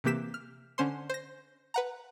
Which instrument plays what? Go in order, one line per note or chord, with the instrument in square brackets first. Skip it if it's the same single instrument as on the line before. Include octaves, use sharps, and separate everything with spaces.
[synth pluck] C3 E3 A#3 G4 B6 E7
F6
D3 C#4 C5 C6
C5 A#6
B4 F#5 A#5